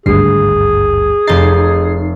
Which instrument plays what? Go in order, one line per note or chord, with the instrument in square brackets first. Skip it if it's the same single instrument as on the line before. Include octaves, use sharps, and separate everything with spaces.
[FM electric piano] G#1 D2 G2 [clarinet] G#4 [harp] C7
[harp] F1 G6 A6 [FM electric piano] D#4 C7